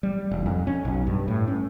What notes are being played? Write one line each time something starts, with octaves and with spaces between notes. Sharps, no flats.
G3
E1
F2
C#4
B1
G2
A2
C#4